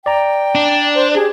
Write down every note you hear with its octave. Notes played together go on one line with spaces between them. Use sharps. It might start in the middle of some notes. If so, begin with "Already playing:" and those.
D5 G5 A#5
D4
C5
G4 G#4